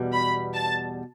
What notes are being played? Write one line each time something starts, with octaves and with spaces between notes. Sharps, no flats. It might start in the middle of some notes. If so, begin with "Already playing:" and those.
Already playing: E2 B2 G3
B5
A5